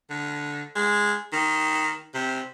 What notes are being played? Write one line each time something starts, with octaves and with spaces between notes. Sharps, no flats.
D3
G#3
D#3
C3